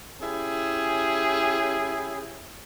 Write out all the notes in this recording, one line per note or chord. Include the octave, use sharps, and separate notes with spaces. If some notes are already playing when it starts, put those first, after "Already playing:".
C#4 E4 G4 G#4